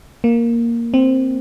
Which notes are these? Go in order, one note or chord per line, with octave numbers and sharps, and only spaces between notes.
A#3
C4